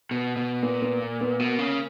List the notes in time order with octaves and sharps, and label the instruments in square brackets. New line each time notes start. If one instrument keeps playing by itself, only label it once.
[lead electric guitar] B2
B2
[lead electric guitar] A#2 [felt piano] B3
[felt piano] B3
A#3
B3
[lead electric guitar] B2 [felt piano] A#3
[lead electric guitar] C#3